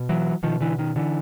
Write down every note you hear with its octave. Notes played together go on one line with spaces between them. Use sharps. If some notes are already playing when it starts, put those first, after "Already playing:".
Already playing: B2
E3 F#3
B2 D#3 F3
D3 E3
D#3
D3 E3